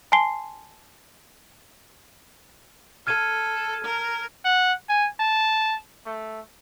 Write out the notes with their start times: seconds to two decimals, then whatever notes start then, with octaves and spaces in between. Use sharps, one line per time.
0.12 G#5 A5 C6 C7 G7
3.07 A4 F6 G#6 D#7
3.84 A#4
4.45 F#5
4.89 G#5
5.20 A5
6.06 A3